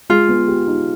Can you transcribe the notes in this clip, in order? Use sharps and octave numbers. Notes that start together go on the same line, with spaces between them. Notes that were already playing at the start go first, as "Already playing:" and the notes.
G#3 F4
B3
G4
D#4